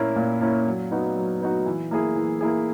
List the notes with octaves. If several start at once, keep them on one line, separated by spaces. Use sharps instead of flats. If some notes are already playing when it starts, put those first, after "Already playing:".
Already playing: A#2 A#3 C#4 E4
A#2
A#3 C#4 E4
F#3
B3 D#4 F#4
F#3
B3 D#4 F#4
E3
A#3 E4 G#4
E3
A#3 E4 G#4